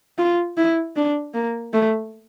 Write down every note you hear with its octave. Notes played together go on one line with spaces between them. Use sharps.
F4
E4
D4
A#3
A3